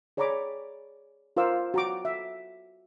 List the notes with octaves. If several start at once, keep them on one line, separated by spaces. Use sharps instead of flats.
G#4 C#5 D5 A#5 B5 D6
F4 A#4 C5 F5 D6 E6
F#4 A#5 D6
E5